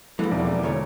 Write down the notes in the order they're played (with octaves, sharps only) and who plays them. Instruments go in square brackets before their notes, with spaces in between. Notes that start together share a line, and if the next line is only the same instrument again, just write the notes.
[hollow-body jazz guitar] F2 E3 [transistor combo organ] F#3 A#3 A4 [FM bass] G#3
[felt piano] E2 B2 [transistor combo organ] E4 A#4 D5
[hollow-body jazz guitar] D2 C#5